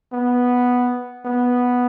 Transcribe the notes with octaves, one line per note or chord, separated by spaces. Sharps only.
B3
B3